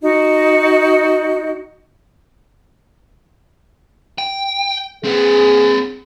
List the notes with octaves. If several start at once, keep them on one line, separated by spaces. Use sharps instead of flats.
D#4 F#4 D#5
G5
C4 G#4 B4